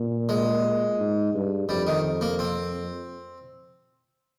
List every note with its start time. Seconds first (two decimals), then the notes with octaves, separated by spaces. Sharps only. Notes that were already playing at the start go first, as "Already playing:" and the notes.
Already playing: A#2
0.29 G#3
0.99 G#2
1.34 G2
1.69 F2 G3
1.87 D#3
2.21 A#3
2.39 C4